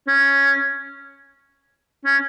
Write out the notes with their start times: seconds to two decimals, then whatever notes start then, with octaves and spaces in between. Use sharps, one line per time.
0.08 C#4
2.05 C#4